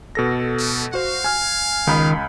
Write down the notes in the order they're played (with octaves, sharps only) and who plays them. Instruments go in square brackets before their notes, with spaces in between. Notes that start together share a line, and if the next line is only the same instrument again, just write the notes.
[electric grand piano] B2 A4 A#6
[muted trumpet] A3
[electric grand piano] F#4 C5 [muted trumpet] F5
[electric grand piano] G#5 F6
[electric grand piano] C#2 B5 [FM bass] D#3